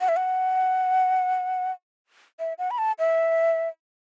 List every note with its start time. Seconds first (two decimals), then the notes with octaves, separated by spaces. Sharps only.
0.01 F#5
0.08 E5
0.16 F#5
2.40 E5
2.58 F#5
2.71 B5
2.78 A5
2.99 E5